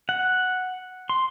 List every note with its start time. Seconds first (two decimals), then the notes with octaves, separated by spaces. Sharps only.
0.09 F#5
1.09 C6